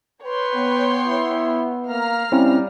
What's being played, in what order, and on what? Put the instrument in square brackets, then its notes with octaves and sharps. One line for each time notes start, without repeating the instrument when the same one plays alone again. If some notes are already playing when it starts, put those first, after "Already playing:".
[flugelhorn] B4 [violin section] C#5 G5 C6
[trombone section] B3
[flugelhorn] E4
[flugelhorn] A#3 [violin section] F5 A#5 F6
[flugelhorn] G3 [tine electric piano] C4 C#4 E4